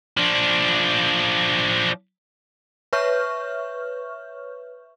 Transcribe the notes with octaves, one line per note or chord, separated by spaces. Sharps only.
F3 D4
B4 C#5 E5 C#6 F6 G6